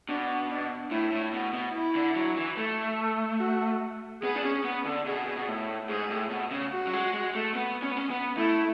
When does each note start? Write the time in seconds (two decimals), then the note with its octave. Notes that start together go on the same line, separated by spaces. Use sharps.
0.09 B2 D4
0.50 D4
0.91 A2 E4
1.12 A2
1.33 B2
1.53 B2
1.74 E4
1.95 D3
2.16 F#3
2.36 E3
2.57 A3
3.40 F#4
4.23 B3 G#4
4.35 D4
4.43 C#4
4.64 B3
4.86 D3
5.06 B2 G#4
5.37 B2
5.48 A2
5.89 G#2 G#4
6.10 A2
6.30 B2
6.51 C#3
6.72 F#4
6.87 F#3
6.93 G#3
7.14 G#3
7.35 A3
7.55 B3
7.82 C#4
7.90 B3
7.97 C#4
8.10 B3
8.37 A3 E4